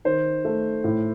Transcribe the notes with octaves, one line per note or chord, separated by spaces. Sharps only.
D#3 C5
A3
A2